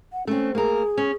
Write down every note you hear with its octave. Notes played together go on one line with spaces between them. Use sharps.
F#5
A3 C4 C#4
A#3 G#4 A#4
C#4